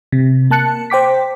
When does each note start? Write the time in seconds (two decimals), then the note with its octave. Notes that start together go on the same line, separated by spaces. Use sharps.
0.12 C3
0.51 A#3 A5 F#6 C#7
0.90 C5 G5 D6 B6